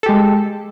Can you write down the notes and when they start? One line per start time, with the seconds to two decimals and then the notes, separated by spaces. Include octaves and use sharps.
0.03 A4
0.06 G4
0.09 G#3